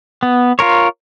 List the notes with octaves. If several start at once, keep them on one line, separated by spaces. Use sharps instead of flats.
B3
F4 A#4 C#5